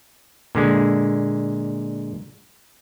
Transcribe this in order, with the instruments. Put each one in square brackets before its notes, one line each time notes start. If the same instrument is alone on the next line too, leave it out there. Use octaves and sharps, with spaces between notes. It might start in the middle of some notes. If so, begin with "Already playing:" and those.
[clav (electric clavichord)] A#2 D3 G#3